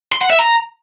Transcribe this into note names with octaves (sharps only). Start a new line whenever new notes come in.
C6
F#5
E5
A#5